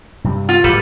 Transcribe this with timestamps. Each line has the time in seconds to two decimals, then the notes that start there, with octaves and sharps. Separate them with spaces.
0.24 G2 C3 G3
0.49 F4
0.64 D1 G#2 D3 G3 A4 B4